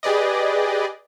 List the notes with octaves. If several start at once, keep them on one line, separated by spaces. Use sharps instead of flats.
G4 G#4 B4 D5 D#5